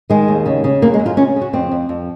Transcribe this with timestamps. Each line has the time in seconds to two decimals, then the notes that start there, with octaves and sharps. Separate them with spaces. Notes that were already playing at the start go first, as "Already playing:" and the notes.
0.10 D#3 G#3
0.28 D#2
0.46 C#3
0.64 C#3
0.82 F#2 A#3
0.94 G#3
1.00 F#2
1.06 F4
1.17 C#3 C#4
1.36 C#3
1.41 F#4
1.53 F2 C4
1.72 F2
1.89 F2